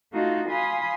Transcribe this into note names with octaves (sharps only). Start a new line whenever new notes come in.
A3 D#4 F4 F#4
F5 G#5 B5 C6 D#6